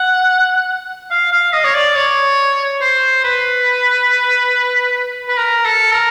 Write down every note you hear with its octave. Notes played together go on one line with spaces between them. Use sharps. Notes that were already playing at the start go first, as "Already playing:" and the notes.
Already playing: F#5
F5
F5
D#5
C#5
D5
C#5
C5
B4
B4
A#4
A4
A#4